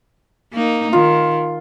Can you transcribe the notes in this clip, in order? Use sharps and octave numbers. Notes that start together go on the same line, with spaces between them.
A#3 D#4
D#3 F4